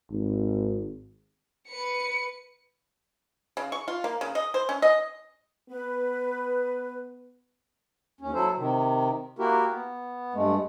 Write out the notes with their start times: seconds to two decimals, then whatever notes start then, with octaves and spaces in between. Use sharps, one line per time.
0.10 G#1
1.69 B4 C#7
3.57 C#3
3.72 C#6
3.88 F4
4.04 A#3
4.21 C#3
4.35 D#5
4.54 C5
4.69 C#4
4.82 D#5
5.69 B3 B4
8.21 D#2 C#4
8.34 F#3 E4 A4 C5
8.57 C3 D#3
9.39 A#3 E4 F#4 G4 A#4
9.70 B3
10.34 G2 G#3 A3